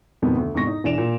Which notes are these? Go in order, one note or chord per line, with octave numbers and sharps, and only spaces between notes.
F2 B2 D#3 B3 C4
D2
E2 G#2 C3 C#6 A#6
D#4
E1 E3 D4 D7 E7 F7
A#2